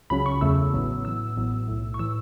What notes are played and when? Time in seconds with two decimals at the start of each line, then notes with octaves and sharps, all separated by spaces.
0.10 C#2 C#3 F#3 C#4 B5
0.26 C#6
0.41 E2 C#3 A3 C#4 E6
0.73 A1 A2 F#3 B3
1.05 A2 E3 B3 E6
1.37 A1 A2 F#3 B3
1.68 B1 A2 A3
1.94 C#6
1.99 A2 E3 E6